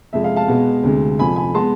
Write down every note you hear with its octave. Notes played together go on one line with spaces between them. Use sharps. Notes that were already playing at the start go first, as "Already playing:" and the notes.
F2 C3 G#3 E5
F5
F5 A5
B2 G#3 B3
D2 C3 G#3
F2 C3 F3 G#5 B5
G#5 B5
G#3 B3 A5 C6